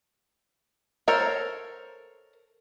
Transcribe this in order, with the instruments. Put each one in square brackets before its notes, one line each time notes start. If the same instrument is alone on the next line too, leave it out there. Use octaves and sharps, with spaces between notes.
[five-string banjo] A4 A#4 C5 C#5